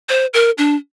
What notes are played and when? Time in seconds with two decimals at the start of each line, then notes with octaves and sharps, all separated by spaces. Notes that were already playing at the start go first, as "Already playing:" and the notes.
0.09 C5
0.34 A#4
0.58 D4